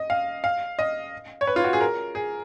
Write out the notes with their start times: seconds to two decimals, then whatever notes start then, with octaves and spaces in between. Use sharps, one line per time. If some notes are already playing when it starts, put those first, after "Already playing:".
Already playing: D#5
0.10 F5
0.44 F5
0.79 D#5
1.41 C#5
1.47 B4
1.56 F4
1.64 F#4
1.73 G#4
1.81 A#4
2.15 G#4